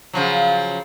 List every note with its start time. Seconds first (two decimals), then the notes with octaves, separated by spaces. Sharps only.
0.14 C#3 F3 F#3